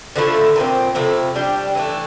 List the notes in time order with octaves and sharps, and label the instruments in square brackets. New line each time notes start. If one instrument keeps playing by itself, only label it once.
[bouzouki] D3 F3 A3 E4
A#2 F3 C4
C3 F3 A3 E4
G3 D4 G4
E3 A3 D4